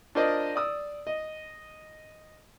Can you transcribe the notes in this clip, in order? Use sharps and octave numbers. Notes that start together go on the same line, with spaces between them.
D4 F4 A#4 C5 D5 D#5
D5 D#6 E6
D#5